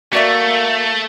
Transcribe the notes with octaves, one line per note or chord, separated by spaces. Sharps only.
A3 A#3 F#4 D5 E5